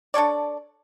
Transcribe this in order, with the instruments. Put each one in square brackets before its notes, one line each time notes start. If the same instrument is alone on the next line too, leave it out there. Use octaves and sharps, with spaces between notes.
[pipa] D4 A4 C#5 D5